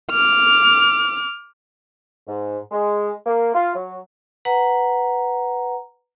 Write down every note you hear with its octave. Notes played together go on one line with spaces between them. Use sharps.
D6 F6
G#2
G#3
A#3
F4
F#3
B4 F#5 A#5